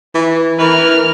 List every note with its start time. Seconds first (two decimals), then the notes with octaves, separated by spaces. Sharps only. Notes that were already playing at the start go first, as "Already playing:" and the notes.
0.15 E3
0.59 E3 A#4 B4 F6